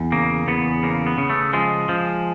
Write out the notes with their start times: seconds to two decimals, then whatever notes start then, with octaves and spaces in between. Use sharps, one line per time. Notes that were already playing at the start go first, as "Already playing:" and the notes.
Already playing: E2
0.12 C#3 A#3
0.48 E2 B3
0.83 C#3 A#3
1.06 B3
1.18 C#3
1.30 A3
1.53 F3 G#3
1.89 F3